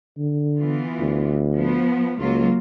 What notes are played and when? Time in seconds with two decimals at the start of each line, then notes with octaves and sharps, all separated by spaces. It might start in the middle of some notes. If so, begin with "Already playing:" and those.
0.18 D3
0.58 E3 B3 F4
0.99 D2
1.54 F3 B3
2.19 C#2 F#3 A#3 F4